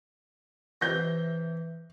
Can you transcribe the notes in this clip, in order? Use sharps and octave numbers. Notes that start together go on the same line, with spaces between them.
C3 E3 G6 A#6